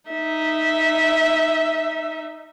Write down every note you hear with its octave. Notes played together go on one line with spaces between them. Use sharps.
D#4 E5